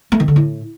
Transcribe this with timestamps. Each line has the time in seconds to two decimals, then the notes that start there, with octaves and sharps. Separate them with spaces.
0.12 A3
0.20 D#3
0.28 D3
0.36 A2